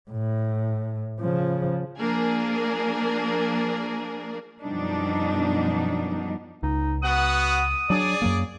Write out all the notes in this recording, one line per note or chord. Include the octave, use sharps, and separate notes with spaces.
A2
C#3 F3
F3 A#3 D4 G#4 A#4
F#2 B2 F3 G3 D4 D#4
C#2 D#4
B3 F#4 F#5 D#6
F#3 D4 G#4 D5
F#2 F#3 A#3